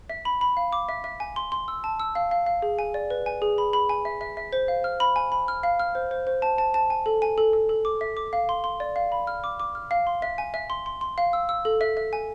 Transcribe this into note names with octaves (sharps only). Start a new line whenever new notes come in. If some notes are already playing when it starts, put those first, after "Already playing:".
E5
B5
B5
F5
D6
E5
E5
G#5
C6
C6
E6
A5
E6
F5
F5
F5
G#4
G#5
D5
B4
G#5
G#4
B5
B5
G#5
E5
E5
E5
C5
F5
F6
B5
G#5
B5
F6
F5
F6
C5
C5
C5
A5
A5
A5
G#5
A4
G#5
A4
A4
A4
D6
E5
D6
F5
C6
C6
D5
F5
B5
F6
D6
D6
F6
F5
C6
E5
G#5
E5
C6
C6
C6
F5
E6
E6
A4
E5
E5
G#5